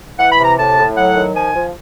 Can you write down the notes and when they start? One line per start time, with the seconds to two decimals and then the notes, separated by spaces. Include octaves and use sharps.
0.18 E3 F#5
0.32 B5
0.39 C3
0.44 A#5
0.58 A2 A5
0.77 A2
0.96 F#3 F#5
1.16 D#3
1.34 F3 G#5
1.55 F3